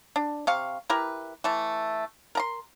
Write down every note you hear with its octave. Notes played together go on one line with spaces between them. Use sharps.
D4
C3 F5 C#6
E4 G4 A#4 B4
E3 A3
A#4 A#5 C6